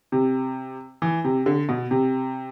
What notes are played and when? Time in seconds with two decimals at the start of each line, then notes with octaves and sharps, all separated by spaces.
0.12 C3
1.02 E3
1.24 C3
1.46 D3
1.69 B2
1.91 C3